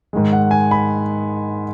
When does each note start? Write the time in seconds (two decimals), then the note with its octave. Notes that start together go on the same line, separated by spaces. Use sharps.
0.13 G#2 D#3 G#3
0.33 F#5
0.51 G#5
0.71 B5